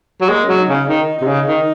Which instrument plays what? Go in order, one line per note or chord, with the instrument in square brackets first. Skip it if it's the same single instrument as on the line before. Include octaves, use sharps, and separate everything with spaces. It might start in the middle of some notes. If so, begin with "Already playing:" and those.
[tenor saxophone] F#3
[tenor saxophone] G#3 [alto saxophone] A#3
[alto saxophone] C#4
[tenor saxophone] F#3
[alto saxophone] D#4
[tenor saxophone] C#3
[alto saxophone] C#4
[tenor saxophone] D#3 [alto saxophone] D#4
[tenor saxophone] C3 [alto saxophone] D#4
[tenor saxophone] C#3
D#3